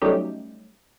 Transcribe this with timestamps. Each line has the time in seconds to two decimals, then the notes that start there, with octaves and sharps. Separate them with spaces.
0.02 F#3 G3 A3 C#4 D#4 G4